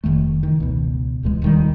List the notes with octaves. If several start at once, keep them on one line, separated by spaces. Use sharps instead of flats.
F1 D2 D#3 A3
D#3
C#2 B2
D1 C#2 E3 G#3
D#1 D#3 G3